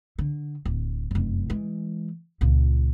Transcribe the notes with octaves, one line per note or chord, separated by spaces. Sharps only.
D3
D1
F1 F#2
E3 G#3
C#2 A#2